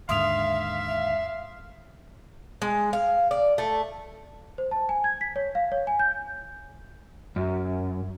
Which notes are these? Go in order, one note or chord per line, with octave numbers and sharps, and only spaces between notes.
D#2 G#2 D3 E5 F5 C6 D#6 F7
G#3
F5
D5
A3
C5
A5
G#5
G#6
B6
C#5
F5
C#5
G#5
G6
F#2